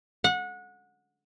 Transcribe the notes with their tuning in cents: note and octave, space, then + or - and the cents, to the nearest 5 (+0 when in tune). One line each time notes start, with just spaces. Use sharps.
F#5 -25